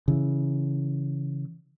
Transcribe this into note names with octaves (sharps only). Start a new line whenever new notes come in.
C#3 E3